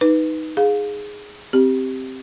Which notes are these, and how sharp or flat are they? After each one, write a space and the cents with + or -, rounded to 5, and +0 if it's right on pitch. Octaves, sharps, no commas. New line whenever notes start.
D#4 +5 B4 +0
G#4 +0 F5 +20
C4 +0 G4 +0